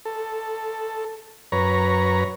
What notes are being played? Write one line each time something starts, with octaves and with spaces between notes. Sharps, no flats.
A4
F#2 B4 C#5 A#5